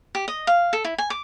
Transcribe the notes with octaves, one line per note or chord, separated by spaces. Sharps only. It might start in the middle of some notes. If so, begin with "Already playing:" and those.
G4
D#5
F5
A4
E4
G#5
D6